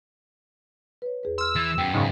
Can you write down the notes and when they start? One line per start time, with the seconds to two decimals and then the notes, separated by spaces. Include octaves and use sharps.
1.02 B4 C#5
1.23 E2 G#4 B4
1.38 C6 E6 F6
1.56 E3 A6
1.78 F#2 B3 C#4 G5
1.94 G#2 C#3